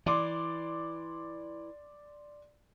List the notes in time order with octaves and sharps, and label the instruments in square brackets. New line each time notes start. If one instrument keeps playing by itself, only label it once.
[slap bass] E3 [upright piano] D5 C6 D6